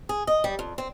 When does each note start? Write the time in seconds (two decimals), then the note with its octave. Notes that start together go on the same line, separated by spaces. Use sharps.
0.09 G#4
0.27 D#5
0.44 G3
0.59 F2
0.78 C4